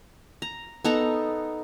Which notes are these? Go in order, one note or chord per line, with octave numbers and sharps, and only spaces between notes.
A#5
B3 D#4 A4 A#5